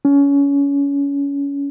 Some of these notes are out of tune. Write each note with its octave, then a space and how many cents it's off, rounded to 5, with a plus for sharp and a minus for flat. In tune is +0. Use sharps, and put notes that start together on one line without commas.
C#4 +25